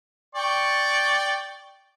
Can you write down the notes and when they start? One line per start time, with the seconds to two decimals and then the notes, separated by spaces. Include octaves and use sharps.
0.35 D5 G5 C#6